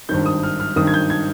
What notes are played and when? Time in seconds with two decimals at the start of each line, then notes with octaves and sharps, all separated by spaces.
0.09 G#1 G2 D#3 G6
0.26 D#6
0.43 F6
0.60 F6
0.76 G#1 G2 D#3 D#6
0.87 G#6
0.94 G6
1.10 G#6